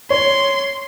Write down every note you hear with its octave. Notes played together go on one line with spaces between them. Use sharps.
C#5 C6